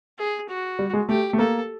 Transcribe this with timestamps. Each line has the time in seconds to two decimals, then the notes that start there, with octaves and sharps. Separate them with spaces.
0.18 G#4
0.48 F#4
0.79 G3
0.93 G#3
1.09 A3 G4
1.33 A3
1.39 A#3 A4